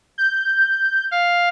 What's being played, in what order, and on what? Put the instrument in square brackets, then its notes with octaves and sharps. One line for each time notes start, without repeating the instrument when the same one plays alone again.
[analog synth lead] G6
[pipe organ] F5